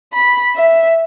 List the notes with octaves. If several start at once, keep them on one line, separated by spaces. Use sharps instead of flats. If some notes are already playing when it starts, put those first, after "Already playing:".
B5
E5